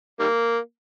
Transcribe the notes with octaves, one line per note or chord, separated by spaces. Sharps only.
D#3 G3 A#3